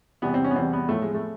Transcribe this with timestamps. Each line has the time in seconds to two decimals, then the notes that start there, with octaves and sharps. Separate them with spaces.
0.22 E2 C3 E3 G3 B3
0.34 C4
0.44 C#4
0.51 B3
0.55 E2 C3 E3 G3 C4
0.73 B3
0.89 A2 F3 A3
1.02 G#3
1.14 A3